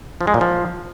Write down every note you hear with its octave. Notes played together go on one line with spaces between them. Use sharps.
F3
G#3
A#2
F3